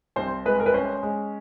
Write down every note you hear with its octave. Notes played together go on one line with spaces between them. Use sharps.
C2 C5
G#3 B4
A#4
B4
C#4 C5
G#3